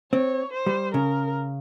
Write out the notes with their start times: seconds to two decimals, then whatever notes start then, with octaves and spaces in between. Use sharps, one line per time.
0.12 C4 C#5
0.53 C5
0.66 G3
0.94 C#3 A#4